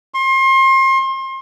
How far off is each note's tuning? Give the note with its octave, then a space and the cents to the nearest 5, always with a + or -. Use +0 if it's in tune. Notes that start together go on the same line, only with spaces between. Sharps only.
C6 +35